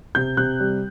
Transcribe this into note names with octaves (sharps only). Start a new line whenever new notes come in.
C3 G6
C3 F#6
G3